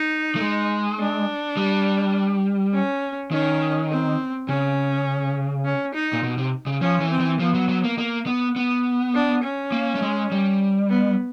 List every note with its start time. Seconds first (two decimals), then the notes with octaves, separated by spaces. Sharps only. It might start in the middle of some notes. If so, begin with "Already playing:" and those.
Already playing: D#4
0.36 A3
0.41 G#3
0.99 D4
1.57 G3
2.74 C#4
3.32 D#3 C#4
3.91 C4
4.49 C#3 C#4
5.65 C#4
5.95 D#4
6.13 A#2
6.23 B2
6.38 C3
6.66 C#3
6.81 F3 C#4
7.01 E3
7.10 C4
7.20 E3
7.40 F3 B3
7.54 F#3
7.69 F#3
7.84 A#3
7.98 A#3
8.27 B3
8.56 B3
9.14 D4
9.43 C#4
9.72 A#3
9.95 A3
10.02 G#3
10.32 G3
10.89 B3